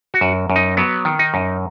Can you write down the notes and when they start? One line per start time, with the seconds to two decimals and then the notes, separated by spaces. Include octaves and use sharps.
0.14 F#4
0.21 F#2
0.50 F#2
0.56 D#4
0.77 F#3 B3
1.05 D#3
1.19 D#4
1.34 F#2